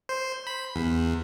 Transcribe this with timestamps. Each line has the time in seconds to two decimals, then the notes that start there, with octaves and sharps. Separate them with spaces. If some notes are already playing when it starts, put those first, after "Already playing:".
0.09 C5
0.47 B5
0.76 E2